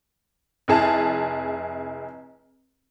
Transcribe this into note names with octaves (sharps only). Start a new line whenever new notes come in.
F1 E4 G#4 A5